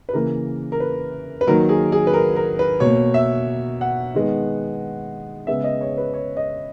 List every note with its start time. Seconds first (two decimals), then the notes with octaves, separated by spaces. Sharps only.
0.09 B4
0.13 C#3 E3 A#3 A#4
0.72 A#4
0.80 B4
1.41 B4
1.47 D#3 F#3 A#3 A#4
1.69 G#4
1.92 G#4
2.07 B4
2.13 A#4
2.36 A#4
2.59 B4
2.80 B2 A#3 C#5
3.14 E5
3.81 F#5
4.14 D#3 G#3 B3
5.47 C#3 G#3 B3 E5
5.64 D#5
5.81 C#5
5.98 B4
6.14 C#5
6.37 D#5